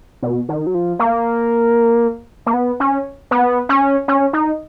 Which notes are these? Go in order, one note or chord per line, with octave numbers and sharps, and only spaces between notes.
B2
D#3
F#3
F3
A#3
A#3
B3
C#4
B3
C#4
C#4
D#4